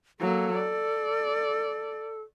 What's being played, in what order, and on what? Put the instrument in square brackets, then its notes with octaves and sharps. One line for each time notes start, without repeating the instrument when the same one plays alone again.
[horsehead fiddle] F#3 A#3 [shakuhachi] A4
[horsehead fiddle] D5